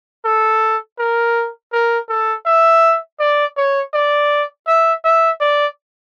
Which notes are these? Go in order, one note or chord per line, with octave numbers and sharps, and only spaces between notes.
A4
A#4
A#4
A4
E5
D5
C#5
D5
E5
E5
D5